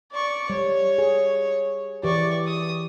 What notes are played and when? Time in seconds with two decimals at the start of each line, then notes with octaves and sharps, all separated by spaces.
0.12 D5 C#6
0.50 G3 C#5
0.98 G#4
2.04 E3 G4 D5 C#6
2.47 D#6